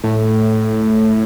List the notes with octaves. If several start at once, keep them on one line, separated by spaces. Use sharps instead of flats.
A2